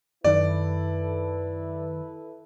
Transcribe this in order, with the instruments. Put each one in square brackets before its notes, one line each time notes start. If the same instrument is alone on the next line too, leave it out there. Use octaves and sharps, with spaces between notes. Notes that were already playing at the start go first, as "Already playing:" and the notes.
[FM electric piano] F#2 D#3 [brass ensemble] E4 A4 B4 [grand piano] D5